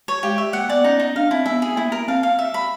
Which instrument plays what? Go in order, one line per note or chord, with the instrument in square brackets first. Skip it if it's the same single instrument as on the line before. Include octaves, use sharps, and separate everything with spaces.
[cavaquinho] C#5
[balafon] G#3 [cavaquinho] G4
[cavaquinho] E5
[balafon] A#3 [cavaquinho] F#5
[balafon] B3 [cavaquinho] D5
[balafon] C#4 [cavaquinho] D#4
[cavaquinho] D#4
[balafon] D4 [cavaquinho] F5
[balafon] C4 [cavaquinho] E4
[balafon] B3 [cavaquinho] E5
[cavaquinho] G#4
[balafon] A#3 [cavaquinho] E4
[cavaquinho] A#4
[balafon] C4 [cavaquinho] F5
[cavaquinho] F5
E5
B5